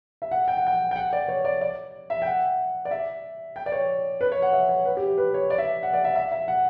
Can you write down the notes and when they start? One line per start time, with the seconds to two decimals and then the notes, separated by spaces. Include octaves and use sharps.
0.22 E5
0.31 F#5
0.48 G5
0.57 F#5
0.67 G5
0.91 G5
0.96 F#5
1.13 D5
1.28 C#5
1.45 D5
1.61 D5
2.10 E5
2.22 G5
2.26 F#5
2.85 D5
2.91 E5
3.56 G5
3.66 D5
3.72 C#5
4.21 B4
4.32 C#5
4.42 F#5
4.53 E5
4.69 C#5
4.85 B4
4.97 G4
5.17 B4
5.34 C#5
5.50 D5
5.58 E5
5.83 F#5
5.93 D5
6.04 E5
6.15 E5
6.32 E5
6.48 F#5